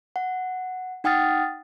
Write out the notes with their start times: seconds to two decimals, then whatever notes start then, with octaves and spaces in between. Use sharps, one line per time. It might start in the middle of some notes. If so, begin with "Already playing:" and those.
0.16 F#5
1.04 D#4 F#5 G5 D#6 F6 A6